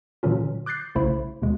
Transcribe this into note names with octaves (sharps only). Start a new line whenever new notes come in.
A#2 D3 E3 F#3 C#4 F4
D6 F#6 G6 A6 C7
B1 C#3 A3 E4 C5 B5
D#2 B2 G#3